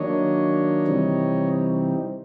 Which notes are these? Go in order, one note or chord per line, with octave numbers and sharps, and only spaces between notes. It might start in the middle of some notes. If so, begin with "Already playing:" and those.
Already playing: D#3 F#3 A#3 D4 C#5 D#5
C3 E3 G3 C4 D#4